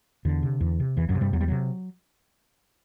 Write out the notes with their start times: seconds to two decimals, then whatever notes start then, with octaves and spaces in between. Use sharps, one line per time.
0.25 E2 D3
0.43 C3
0.61 E2
0.80 C3
0.97 E2 E3
1.09 F#2 F#3
1.15 C3
1.21 G2 G3
1.33 E2 F#3
1.41 G3
1.48 C3 F#3